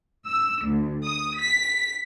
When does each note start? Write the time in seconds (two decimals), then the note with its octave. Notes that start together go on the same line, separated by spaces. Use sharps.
0.24 E6
0.63 D2
1.05 D#6
1.37 B6